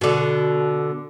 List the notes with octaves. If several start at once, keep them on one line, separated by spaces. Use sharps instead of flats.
B2 D3